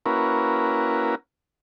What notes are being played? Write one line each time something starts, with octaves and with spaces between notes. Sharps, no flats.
A#3 C#4 E4 F#4 A#4 B4